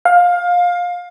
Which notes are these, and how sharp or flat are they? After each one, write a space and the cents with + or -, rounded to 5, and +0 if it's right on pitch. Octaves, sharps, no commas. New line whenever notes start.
F5 +20